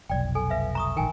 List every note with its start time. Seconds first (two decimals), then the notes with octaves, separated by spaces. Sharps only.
0.10 F1 B1 D5 G5
0.35 A4 G#5
0.50 B4 E5 F5
0.75 A#5 C#6 D#6
0.96 A#1 D#3 A#4 G5 G#5